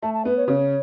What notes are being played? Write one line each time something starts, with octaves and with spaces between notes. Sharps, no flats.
A3 A5
A5
B3 B4
C#5
C#3 C#5